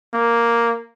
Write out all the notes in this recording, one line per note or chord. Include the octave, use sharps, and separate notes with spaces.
A#3